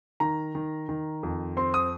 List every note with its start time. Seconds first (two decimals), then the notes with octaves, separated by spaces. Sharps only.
0.20 D#3 A#5
0.55 D#3
0.89 D#3
1.23 F2
1.57 C4 C6
1.74 D#6